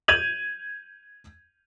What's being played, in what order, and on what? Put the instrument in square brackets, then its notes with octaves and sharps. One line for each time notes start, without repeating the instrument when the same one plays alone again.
[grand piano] G6 G#6 D#7 F7 F#7